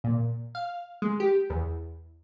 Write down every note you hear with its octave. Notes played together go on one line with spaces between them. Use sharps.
A#2
F5
G#3
G4
E2